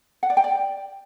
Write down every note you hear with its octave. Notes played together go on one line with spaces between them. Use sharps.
F#5
D5
G5
D5